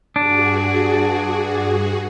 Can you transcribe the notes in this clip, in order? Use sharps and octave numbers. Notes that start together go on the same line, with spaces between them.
G2 D4 F#4 G#4